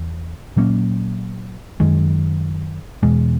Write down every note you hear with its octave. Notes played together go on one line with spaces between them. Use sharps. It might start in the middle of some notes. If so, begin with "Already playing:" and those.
Already playing: E2
A#2 F#3 A#3 C#4
F#2 D#3 G#3
E2 B2 G#3